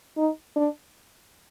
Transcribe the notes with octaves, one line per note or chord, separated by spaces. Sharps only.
D#4
D4